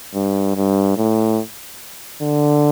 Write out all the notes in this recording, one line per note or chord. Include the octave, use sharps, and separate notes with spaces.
G2
G2
A2
D3